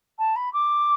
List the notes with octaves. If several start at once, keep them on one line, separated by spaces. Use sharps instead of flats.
A5
B5
D6